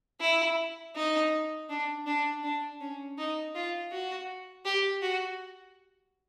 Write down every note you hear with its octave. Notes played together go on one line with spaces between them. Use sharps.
E4
D#4
D4
D4
D4
C#4
D#4
F4
F#4
G4
F#4